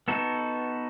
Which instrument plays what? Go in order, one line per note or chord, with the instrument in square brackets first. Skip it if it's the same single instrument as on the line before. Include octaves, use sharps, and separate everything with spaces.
[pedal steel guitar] B3 D#4 F#4 A4